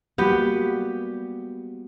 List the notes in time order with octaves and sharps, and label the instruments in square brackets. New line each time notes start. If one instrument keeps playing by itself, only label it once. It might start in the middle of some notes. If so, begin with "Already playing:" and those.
[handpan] G3 A#3 F#4 [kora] B3 G4